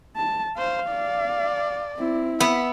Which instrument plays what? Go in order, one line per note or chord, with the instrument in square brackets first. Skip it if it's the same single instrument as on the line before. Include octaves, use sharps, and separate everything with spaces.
[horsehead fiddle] A5
[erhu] C5 [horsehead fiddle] F5
[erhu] D5
[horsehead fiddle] C4 E4
[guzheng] B3 [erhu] E5